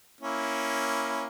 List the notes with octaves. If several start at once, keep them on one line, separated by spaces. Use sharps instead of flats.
A#3 C#4 E4